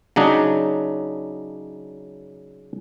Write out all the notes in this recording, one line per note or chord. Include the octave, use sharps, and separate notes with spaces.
C#3 F#3 D4 D#4